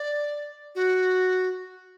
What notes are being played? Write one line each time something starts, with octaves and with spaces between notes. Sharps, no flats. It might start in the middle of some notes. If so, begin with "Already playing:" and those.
Already playing: D5
F#4